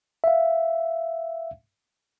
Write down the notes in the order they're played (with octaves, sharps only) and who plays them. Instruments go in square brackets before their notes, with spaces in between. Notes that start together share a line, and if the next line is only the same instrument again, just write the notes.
[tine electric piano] E5 F5